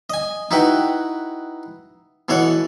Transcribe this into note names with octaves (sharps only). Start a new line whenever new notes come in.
D#5 G#5
D#4 E4 F#4 B4 G5
B2 E3 A4 C#5 F#5